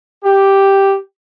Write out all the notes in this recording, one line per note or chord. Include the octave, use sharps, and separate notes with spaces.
G4